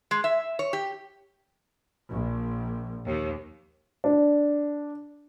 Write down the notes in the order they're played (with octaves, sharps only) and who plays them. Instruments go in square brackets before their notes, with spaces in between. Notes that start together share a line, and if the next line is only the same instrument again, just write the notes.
[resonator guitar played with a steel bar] G#3
E5
C#5
G4
[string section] A#1
D#2
[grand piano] D4